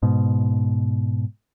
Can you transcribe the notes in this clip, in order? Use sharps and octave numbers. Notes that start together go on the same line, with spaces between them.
G#2 B2